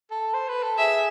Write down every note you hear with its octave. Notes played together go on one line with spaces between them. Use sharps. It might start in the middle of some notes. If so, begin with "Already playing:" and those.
A4
C5
B4
A4
G#4 E5